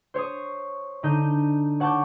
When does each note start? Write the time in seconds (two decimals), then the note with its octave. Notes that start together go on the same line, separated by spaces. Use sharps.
0.14 C5 C#5 C#6 D#6
1.03 D3 D#4 G6
1.80 C#5 F#5 A5 C#6 D6 G6